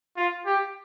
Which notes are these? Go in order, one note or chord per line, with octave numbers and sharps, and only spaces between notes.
F4
G4